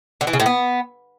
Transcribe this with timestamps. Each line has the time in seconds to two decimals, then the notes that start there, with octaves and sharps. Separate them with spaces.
0.21 D3
0.27 E3
0.33 C#3
0.40 A2
0.46 B3